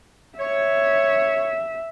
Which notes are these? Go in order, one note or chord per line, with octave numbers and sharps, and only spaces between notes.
C#5 E5